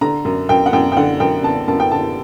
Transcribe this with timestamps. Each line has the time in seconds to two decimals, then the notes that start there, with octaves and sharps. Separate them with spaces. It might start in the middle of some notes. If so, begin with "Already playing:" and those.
0.01 D3 A#5
0.25 F#2
0.49 F#2 G5
0.66 F#5
0.73 F#2 G5
0.92 G5
0.97 D3 F#5
1.20 F#2 G5
1.44 D3 A5
1.68 F#2 A5
1.80 G5
1.91 D3 A5